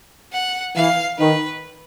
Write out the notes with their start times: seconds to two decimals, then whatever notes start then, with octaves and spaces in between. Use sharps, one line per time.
0.33 F#5
0.76 E3 F5
1.18 D#3 B4